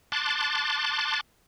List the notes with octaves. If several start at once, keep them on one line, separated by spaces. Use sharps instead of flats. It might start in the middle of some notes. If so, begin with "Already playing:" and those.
A5 C6 D6 F#6 A6